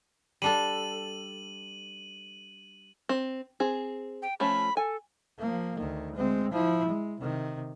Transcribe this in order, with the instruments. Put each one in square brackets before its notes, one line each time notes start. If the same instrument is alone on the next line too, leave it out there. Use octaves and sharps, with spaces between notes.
[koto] G3 D4 A4 [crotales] D#7 F#7
[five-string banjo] C4
C4 G#4
[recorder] G5
[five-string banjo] F3 A3 C#4 [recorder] B5
[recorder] A4 [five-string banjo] G#5
[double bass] F3 A#3
D2 D#3
G#3 C4
F3 E4
G#3
C3 D#3